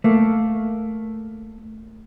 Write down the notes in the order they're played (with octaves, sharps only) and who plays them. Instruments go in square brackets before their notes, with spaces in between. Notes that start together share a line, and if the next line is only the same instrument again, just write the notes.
[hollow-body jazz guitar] A3 A#3